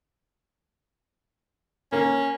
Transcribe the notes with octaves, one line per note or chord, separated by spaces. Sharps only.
A#3 C#4